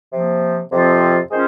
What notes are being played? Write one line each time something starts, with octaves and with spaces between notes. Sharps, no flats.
C3 F3 A#3
F2 C3 F3 C4 F4
D#3 G#3 C#4 F4 C5